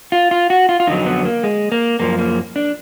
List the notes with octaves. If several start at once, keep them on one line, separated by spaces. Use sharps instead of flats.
F4
F4
F#4
F4
F4
F2 D3 F#3 D#4
B3
A#3
G#3
A#3
F#2 F3 A#3
A#3
D4